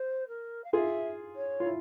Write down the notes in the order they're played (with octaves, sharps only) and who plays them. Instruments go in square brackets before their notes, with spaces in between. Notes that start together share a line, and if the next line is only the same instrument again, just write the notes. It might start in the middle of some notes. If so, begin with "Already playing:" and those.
Already playing: [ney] C5
A#4
F5
[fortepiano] F4 G#4 [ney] E5
[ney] C#5
[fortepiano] F4
E4